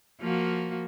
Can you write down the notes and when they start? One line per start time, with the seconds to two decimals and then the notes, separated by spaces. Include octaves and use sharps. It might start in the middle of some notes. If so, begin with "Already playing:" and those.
0.20 F3 A#3 F#4